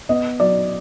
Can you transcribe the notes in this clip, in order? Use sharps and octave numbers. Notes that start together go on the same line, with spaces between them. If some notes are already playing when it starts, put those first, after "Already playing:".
B3 D#5
F#3 D5